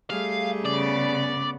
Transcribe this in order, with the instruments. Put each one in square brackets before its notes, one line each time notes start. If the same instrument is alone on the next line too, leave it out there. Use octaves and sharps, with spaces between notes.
[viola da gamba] G3 A3 G#4 [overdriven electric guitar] F5
[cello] C#3 B3 [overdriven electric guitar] D5